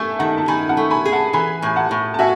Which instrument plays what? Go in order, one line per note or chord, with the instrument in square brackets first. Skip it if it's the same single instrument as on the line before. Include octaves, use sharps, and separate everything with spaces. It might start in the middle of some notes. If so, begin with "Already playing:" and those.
Already playing: [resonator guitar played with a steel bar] A3 [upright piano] E5 G#5 A5
[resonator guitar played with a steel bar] D#3 [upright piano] F#5 A5
[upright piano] A5
[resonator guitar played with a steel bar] D#3 [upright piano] G#5 B5
[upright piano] F#5 A5
[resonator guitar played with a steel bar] A3
[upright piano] G#5 B5
[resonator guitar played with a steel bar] G#4
[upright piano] F#5 A5
[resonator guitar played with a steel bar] E3 [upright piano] G#5 B5
[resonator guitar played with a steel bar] A2 [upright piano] G#5
[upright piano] F#5 A5
[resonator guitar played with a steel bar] A2
[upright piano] A5
[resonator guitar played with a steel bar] F#4 [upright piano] E5 G#5